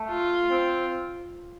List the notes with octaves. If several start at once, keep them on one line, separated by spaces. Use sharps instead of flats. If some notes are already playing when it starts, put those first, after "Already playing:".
Already playing: A3
F4
C4